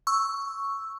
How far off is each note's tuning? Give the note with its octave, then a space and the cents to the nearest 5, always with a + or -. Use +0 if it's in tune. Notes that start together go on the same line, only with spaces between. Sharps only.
C#6 +0 E6 +0